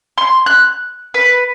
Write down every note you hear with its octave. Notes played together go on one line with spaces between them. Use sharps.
C6
F#6
B4